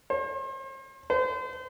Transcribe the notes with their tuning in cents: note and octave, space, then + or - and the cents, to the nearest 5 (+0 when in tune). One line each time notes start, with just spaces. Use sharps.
C5 +40
C5 -35